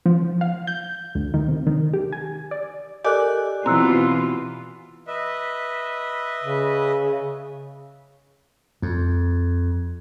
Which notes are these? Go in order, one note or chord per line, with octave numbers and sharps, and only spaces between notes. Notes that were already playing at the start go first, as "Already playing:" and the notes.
F3
F5
G6
D2
D#3
C3
D#3
G4
G#5
D5
G4 A4 A#4 D5 D#5 G#5 D6 F#6
B2 E3 C4 F4 A#5 E6 F#6
B4 D#5 E5
C#3
F2